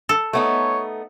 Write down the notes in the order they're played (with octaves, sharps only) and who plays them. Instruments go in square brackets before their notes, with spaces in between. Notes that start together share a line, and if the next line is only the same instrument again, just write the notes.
[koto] A4
[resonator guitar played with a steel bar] A3 B3 D#4 [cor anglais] C#5